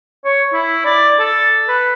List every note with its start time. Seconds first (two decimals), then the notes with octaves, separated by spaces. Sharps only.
0.25 C#5
0.53 E4
0.85 D5
1.20 A4
1.68 B4